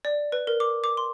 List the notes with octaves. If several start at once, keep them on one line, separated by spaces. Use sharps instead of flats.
D5
B4
A#4
D6
D6
C6